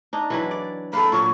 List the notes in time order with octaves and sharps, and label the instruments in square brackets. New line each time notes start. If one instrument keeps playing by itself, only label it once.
[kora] D4 D#4
E3 F#3 B4
D5
[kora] A#3 A4 [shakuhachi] B5
[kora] A#2 F#3 [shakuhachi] C#6